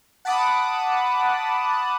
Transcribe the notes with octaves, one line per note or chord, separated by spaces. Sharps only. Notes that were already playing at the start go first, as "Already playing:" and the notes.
F#5 A5 B5 D6 D#6 F#6